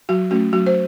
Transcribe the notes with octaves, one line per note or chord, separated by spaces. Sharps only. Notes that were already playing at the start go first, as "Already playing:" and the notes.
F#3 F#4
A3 C#4 F#4
F#3 F#4
C5